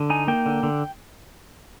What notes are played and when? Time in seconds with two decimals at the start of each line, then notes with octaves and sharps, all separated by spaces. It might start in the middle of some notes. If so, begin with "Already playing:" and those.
Already playing: D3
0.10 D#4 G#5
0.28 A#3 G5
0.46 D3
0.63 D3